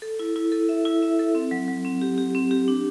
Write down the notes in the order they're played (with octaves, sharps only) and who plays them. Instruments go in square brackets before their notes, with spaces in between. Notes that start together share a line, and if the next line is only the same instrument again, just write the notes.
[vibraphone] A4
E4
E4
A4
E5
E4
E5
A4
C4
F#3
F#3
C4
G4
G4
C4
G4
D4